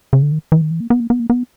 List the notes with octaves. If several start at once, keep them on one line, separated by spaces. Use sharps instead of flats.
C#3
D3
D#3
E3
D#3
E3
A#3
B3
A#3
B3
A#3
B3